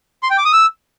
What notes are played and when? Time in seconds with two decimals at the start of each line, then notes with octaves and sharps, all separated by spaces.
0.23 C6
0.30 G5
0.38 D6
0.45 D#6
0.53 E6